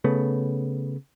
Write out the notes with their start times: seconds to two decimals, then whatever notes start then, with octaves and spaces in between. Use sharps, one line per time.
0.04 C#3 A3 B3